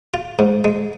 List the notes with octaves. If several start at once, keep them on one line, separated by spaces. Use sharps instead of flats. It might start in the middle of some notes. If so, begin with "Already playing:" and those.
F4
G#2
G#3